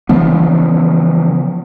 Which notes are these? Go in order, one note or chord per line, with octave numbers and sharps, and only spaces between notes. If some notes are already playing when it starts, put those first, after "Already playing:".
C#3 E3 F3 B3